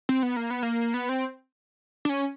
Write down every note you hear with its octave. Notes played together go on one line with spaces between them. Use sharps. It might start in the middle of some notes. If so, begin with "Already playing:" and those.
C4
B3
A#3
B3
A#3
B3
C4
D4
C#4